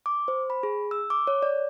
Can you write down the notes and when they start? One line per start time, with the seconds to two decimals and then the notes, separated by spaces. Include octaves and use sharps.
0.06 D6
0.28 C5
0.50 B5
0.63 G#4
0.91 E6
1.10 D6
1.27 C#5
1.42 D5